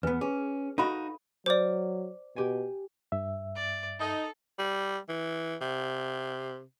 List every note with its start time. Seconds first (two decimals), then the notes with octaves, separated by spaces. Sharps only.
0.03 E2 B3 B4
0.21 C#4 G#4
0.78 D#4 F#4 A4 F5 B5
1.46 F#3 C5 D5 D6 F6
2.36 B2 G4 G#5
3.12 G2 E5
3.56 D5
3.99 D#4 A4
4.59 G3
5.09 E3
5.61 C3